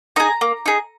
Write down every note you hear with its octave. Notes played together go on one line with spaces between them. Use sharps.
D#4 G#4 A#5
A#3
D#4 G#4